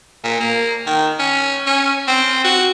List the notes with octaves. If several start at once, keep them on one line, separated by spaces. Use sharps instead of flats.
A#2
A#3
D#3
C#4
C#4
C4
F#4